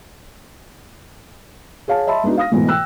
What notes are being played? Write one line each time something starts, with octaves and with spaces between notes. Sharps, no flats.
G#4 C#5 F5 A5
D#5 E5 A5 B5 C6
G#3 B3 D4 D#4 F#4
F5 D#6 A#6
G#2 B2 E3 A3
G5 E6 F#6